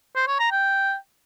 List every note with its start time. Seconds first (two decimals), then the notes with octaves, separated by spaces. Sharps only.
0.15 C5
0.27 C#5
0.39 A#5
0.51 G5